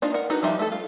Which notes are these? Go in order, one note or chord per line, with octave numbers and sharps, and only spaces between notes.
A#3 D4 D#4 F4
A#4 F#5
D4 D#4 F#4 B4
F3 G3 D#4 E5
A3 A4
F4